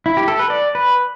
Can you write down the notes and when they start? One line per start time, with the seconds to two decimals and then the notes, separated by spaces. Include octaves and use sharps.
0.06 E4
0.17 G4
0.28 A4
0.39 B4
0.50 D5
0.75 B4